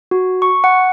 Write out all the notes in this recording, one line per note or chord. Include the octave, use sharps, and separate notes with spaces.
F#4
C#6
F#5